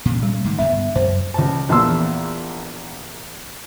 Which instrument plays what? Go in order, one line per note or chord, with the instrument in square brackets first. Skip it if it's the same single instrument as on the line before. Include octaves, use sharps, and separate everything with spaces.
[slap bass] A#2 C#3
[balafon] G3
[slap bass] G#2 D#3
[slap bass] G2 D3 B3 [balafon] E5
[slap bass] F#2 [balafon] C5
[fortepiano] C#2 A5
A#1 E2 A5 C6 E6